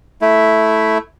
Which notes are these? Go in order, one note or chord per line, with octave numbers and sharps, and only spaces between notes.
A3 E4